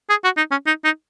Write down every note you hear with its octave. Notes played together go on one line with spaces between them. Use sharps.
G#4
F#4
D#4
C#4
D#4
D#4